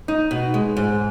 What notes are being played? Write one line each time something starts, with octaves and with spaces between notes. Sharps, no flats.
D#4
B2
G#3
G#2